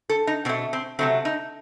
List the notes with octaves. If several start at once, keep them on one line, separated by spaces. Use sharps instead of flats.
A4
D#4
B2 A3 C4
C4
C3 F#3 A3 C4
D#4